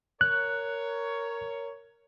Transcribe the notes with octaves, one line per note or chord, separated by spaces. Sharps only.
A#4 C#5 F#6